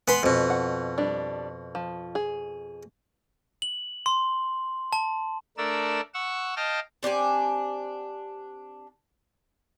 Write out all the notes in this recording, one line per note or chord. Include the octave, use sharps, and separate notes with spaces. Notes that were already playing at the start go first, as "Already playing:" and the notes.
G#3 B3 B4 B5 C6
F2 B2
F#5
G3 D4
F3
G#4
F#7
C6
A5
A3 D4 A#4 D5 E6
F#5 C#6 E6
D#5 F5 G5 A5 D#6 F6
C4 D4 G4 G#5